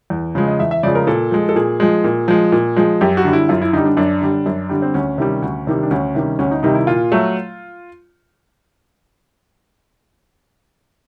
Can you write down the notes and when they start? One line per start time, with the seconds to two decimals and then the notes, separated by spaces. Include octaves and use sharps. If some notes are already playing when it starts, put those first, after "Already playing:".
0.10 E2
0.35 C#3 F3 G#3
0.48 D#5
0.59 E2 E5
0.71 E5
0.83 C#3 F3 G#3 D5
0.95 A#4
1.07 A#2 A4
1.31 F3 G#3
1.49 A4
1.56 A#2 G#4
1.80 F3 G#3
2.04 A#2
2.28 F3 G#3
2.52 A#2
2.76 F3 G#3
3.01 F#2 G4
3.17 F#4
3.24 D3 G3
3.33 E4
3.49 F#2 F4
3.61 E4
3.73 D3 G3 D#4
3.86 D4
3.97 F#2 D4
4.22 D3 G3
4.46 F#2
4.69 D3 G3
4.82 C4
4.94 D2 C#4
5.18 C3 D#3 G3
5.42 D2
5.67 C3 D#3 G3
5.83 D4
5.91 D2 C#4
6.15 C3 D#3 G3
6.39 D2 C#4
6.51 D#4
6.63 C3 D#3 G3 D#4
6.75 E4
6.87 A#2 F4
7.12 F#3 A3